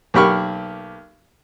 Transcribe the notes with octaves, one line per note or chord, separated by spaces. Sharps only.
B1 A#3 G4 B5 C#6 F6